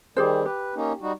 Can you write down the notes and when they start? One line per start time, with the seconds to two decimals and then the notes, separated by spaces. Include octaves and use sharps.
0.17 D#3 G3 G4 G#4 C5
0.46 G4 B4
0.76 A#3 C#4 D#4
1.02 G3 D#4 F#4